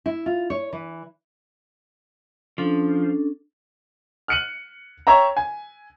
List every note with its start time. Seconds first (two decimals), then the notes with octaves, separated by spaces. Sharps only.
0.06 E4
0.26 F4
0.50 C#5
0.73 E3
2.58 F3 C#4 D4 A4
4.28 F6 F#6 C#7 D#7 F#7
5.07 C#5 E5 G5 A#5
5.37 G#5